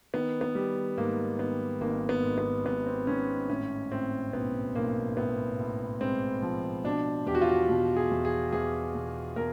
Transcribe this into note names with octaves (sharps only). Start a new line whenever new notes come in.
D#3 B3
B3
G3
G#2 A#3
D#3 B3
G#1 A#3
B3
G#2
B3
G#1 B3
C4
G#2 C#4
A2 C#4
A2 C4
B1 B3
B1 A#3
A2 B3
A2
G#3 C4
F3
B2 D4
E2 G4
F#4
F4
F#4
B2
G#4
E2
G#4
E2 G#4
B2
B2 A#4